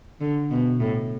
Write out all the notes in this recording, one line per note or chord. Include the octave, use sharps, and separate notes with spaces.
D3
B2
A2